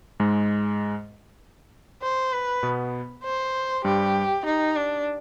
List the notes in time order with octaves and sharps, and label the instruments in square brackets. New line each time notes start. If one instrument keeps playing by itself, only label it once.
[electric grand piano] G#2 G#3
[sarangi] C5
B4
[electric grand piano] B2 B3
[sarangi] C5
[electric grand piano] G2 G3 [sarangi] G4
[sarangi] D#4
D4